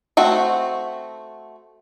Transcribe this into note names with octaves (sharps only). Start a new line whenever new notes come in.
A3 C4 F#4